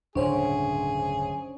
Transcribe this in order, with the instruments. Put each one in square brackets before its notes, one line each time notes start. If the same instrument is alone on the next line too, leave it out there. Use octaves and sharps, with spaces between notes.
[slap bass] D1 G2 C#3 [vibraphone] C#4 [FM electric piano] D4 C5 C#5 [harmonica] G#4